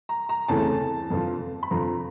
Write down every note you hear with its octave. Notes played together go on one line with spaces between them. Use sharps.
A#5
A#5
E2 C#3 E3 A3 C4 A5
F2 D3 F3
B5
F2 D3 F3 A#5